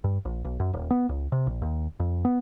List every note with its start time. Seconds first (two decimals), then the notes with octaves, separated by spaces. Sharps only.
0.04 G2
0.25 A#1
0.45 B1
0.60 F#2
0.73 D#1
0.91 B3
1.09 C#2
1.32 C3
1.47 A#1
1.62 D#2
2.00 F2
2.25 B3